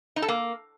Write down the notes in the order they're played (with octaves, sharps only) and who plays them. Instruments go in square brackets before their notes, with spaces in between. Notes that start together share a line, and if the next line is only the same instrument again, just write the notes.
[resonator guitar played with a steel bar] D#4
A4
A#3